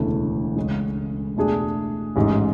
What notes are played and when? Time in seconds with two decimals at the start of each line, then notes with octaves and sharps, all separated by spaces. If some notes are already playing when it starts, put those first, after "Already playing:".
Already playing: E1 D2 C#3 E3 A3
0.56 C#2 C#3 G#3 C#4
1.36 E2 B2 A3 D4 G#4
2.16 A1 G#2 G#3